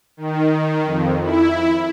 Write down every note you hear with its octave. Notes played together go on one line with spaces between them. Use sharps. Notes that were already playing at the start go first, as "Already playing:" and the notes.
D#3
F2
E4